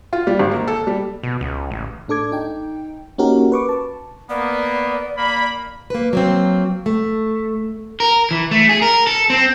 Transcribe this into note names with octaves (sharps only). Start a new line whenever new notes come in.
F4
G3
G#1
A#3
A4
G3
B2
C#2
A1
A2 D4 A4 D6 G#6
D#4 G5
A#3 C#4 D#4 F#4 G4 A#4
B4 C#6 D6
A5
A#3 B3 D5
A#3 B5
A#3 B4
F#3 A#3 C4
A3
A#4
E3
A3
G#4
A#4
A4
C4